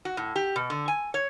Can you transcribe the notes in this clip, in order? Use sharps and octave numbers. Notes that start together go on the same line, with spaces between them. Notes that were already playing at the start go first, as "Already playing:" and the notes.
F#4
A2
G4
B2
D3
G#5
C#5